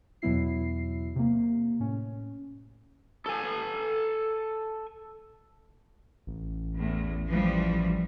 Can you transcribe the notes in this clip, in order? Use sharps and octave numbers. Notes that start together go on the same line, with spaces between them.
E2 B2 F#3 B3 E4 C7
C3 A#3
A2 C#4
A4 G#5
A1
E2 A2
E3 F3 G3